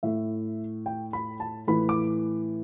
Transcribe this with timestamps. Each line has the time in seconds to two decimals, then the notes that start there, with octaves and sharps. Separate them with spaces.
0.03 A2 A3 E5
0.86 G5
1.13 B5
1.40 A5
1.67 A2 E3 A3 B5
1.89 D6